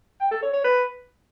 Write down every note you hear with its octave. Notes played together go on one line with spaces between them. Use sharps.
G5
A4
C#5
C#5
B4